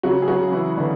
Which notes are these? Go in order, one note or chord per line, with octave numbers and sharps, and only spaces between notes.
C#3 F#3 F#4
G#4
F#3 F#4
C#3
E3 E4
D3 B3 D4